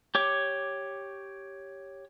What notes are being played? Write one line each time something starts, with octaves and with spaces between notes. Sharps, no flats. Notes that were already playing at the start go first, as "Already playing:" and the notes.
G4 C#5 D6